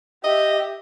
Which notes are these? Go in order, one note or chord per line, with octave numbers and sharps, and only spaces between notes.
G4 D#5 E5